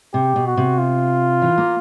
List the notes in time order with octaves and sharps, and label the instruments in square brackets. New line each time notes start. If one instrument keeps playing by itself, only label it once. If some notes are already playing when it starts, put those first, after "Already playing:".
[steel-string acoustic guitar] C3 [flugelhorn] G4
[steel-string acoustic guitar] B2
[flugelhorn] F#4
[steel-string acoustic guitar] C3
[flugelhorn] F4
[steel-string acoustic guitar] E3
A#3